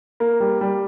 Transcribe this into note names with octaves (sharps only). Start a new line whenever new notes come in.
A#3
G3
G3